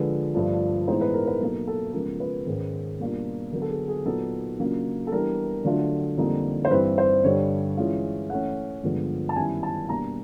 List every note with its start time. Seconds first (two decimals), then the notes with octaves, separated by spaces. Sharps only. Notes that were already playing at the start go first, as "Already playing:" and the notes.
Already playing: D3 F3 G#3 B4
0.35 G2 D3 F3 A3 D4
0.87 A2 E3 G#3 B3 D#4 C5
1.01 B4
1.14 A#4
1.27 B4
1.40 B2 F#3 A#3 D#4 A4
1.68 A4
1.93 C#3 F3 G#3 B3 A#4
2.20 B4
2.46 G#2 D#3 G#3 C#4
2.99 B2 G3 A#3 D4 F4
3.52 D3 F#3 B3 A#4
3.62 A4
3.70 G#4
3.88 G#4
4.05 A#2 F#3 B3 D#4 A4
4.59 C#3 F#3 A#3 D4 F4
5.07 A4
5.12 E3 G3 B3 D4 A#4
5.65 D3 F#3 A3 D4 F4
6.18 F2 D3 G3 A#3 D#4
6.65 C5
6.71 G2 E3 G3 C4 B4
6.98 C5
7.24 G2 D3 G3 C#5
7.77 E3 G#3 C#4 F4
8.30 E3 A3 C#4 F#5
8.83 G2 D3 F3 G#3 B3
9.29 A5
9.36 F#2 D#3 G3 B3 E4 G#5
9.63 A5
9.89 B2 G3 A#3 D4 A#5